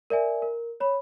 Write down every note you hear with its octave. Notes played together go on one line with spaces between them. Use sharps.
A#4 D5 E5 G#5
A#4
C#5 B5